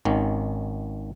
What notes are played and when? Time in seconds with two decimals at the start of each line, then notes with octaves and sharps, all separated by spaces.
0.05 G#1 D#3 C#4